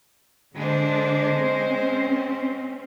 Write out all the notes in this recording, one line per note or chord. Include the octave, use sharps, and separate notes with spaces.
D3 G#3 D4 C5
C4 C#4